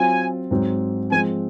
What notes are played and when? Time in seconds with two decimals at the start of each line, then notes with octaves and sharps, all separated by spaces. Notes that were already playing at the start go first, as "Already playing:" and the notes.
Already playing: F#3 C4 F4 G#5
0.51 G#2 F#3 C4
1.11 F3 G#3 C4 G#5